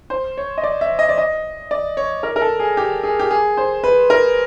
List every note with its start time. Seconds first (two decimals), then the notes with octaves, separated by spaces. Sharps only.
0.10 C5
0.38 C#5
0.58 D#5
0.64 D5
0.81 E5
0.99 D#5
1.09 D5
1.18 D#5
1.71 D5
1.97 C#5
2.23 A#4
2.36 A#4
2.42 A4
2.60 G#4
2.77 G4
3.04 G#4
3.19 G4
3.31 G#4
3.57 C5
3.84 B4
4.10 A#4